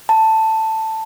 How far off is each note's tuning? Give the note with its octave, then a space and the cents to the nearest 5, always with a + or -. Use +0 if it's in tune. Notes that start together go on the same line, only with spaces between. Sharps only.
A5 +10